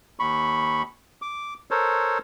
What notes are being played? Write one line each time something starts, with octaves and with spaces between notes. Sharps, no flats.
D#2 B5 C#6
D6
A4 A#4 C5 C#5